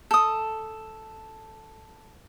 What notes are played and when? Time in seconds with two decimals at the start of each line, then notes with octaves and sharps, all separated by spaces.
0.11 A4 D#6